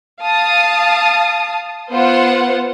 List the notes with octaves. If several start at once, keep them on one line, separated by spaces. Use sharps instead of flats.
F5 A5 D#6
B3 F4 C5 F#5